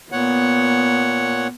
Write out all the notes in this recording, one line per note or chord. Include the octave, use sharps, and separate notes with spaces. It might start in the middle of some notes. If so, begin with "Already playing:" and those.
A#2 B3 C#5 F#5